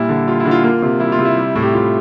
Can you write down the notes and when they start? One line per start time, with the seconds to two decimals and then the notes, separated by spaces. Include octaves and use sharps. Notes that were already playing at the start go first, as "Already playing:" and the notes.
Already playing: A#2 G3 E4
0.09 D3
0.28 G3 F4
0.40 E4
0.45 D3
0.51 F4
0.64 A#3 F4
0.82 C3
1.00 G3 E4
1.12 F4
1.19 C3
1.25 E4
1.37 G3
1.55 A2
1.62 G4
1.74 A2 F4